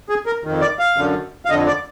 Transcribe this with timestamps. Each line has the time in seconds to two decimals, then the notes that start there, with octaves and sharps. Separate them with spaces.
0.09 G#4
0.26 A#4
0.44 F2 D#3
0.61 D5
0.79 F5
0.97 F#2 D3
1.45 F5
1.50 F2 D3 D#5
1.67 D5